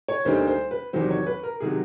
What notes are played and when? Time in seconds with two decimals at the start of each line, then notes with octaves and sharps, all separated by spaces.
0.08 C#5
0.25 D2 D3 G3 A#3 D#4 C5
0.47 C5
0.71 B4
0.93 E2 C3 D#3 F#3 C5
1.10 C#5
1.27 B4
1.43 A#4
1.60 C3 D#3 F#3 G#4